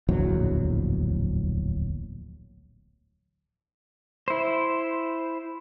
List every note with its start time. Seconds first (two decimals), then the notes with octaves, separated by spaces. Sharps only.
0.09 D1 A#1 E2 F#3
4.28 E4 C5